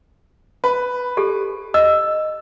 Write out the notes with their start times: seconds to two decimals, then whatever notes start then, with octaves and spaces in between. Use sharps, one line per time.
0.64 B4
1.17 G4 A4
1.74 D#5 E6